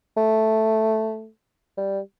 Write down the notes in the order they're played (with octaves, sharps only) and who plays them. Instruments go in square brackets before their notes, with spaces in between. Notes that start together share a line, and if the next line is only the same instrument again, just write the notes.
[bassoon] A3
G3